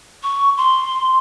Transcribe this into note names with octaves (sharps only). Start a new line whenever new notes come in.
C#6
C6